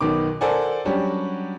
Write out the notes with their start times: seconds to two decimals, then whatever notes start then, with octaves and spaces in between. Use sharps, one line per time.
0.01 B1 B2 D#3 D6
0.41 A4 A#4 C5 D5 F#5 G#5
0.85 F#3 G3 C#4 D4 F#4 G4